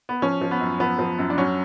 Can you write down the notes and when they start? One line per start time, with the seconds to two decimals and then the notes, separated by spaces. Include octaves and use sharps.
0.09 B3
0.22 F3 C#4
0.41 F3
0.51 B3
0.60 F#2
0.80 F3 B3
0.99 F3
1.19 F#2
1.30 D4
1.38 F#3 C#4